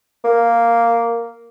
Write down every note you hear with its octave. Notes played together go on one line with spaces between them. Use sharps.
A#3